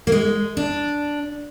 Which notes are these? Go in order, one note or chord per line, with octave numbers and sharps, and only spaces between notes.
A#3
G#3
D4